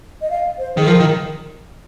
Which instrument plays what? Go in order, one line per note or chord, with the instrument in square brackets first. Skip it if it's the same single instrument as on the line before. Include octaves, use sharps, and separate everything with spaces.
[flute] D#5
F5
C5
[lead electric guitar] D#3 [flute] G#4
[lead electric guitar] F3 [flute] A#4
[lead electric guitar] D#3